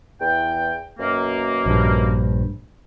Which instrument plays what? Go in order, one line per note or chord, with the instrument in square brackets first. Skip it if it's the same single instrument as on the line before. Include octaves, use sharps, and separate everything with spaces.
[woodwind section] E2 G5
F#2 B2 A#3
[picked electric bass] A#1 G2